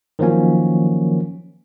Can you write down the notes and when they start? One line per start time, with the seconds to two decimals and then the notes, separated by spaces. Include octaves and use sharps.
0.19 D#3 F3 F#3 A#3 C#4